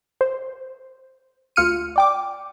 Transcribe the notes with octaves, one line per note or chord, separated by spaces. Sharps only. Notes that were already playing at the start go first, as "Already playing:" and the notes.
C5
D2 F4 F6 C#7 D#7
D5 G5 D6